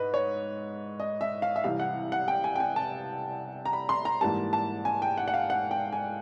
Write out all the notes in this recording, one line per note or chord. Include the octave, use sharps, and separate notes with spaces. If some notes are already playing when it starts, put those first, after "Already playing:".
Already playing: G#2 B4 D#5
C#5
D#5
E5
F5
E5
C2 C3 E3 F5
F#5
F#5
G5
G#5
G5
G#5
A5
A#5
B5
C6
A#5
G#2 E3 G3 A#3 A5
A5
G#5
G5
F#5
F#5
F5
F#5
G5
G#5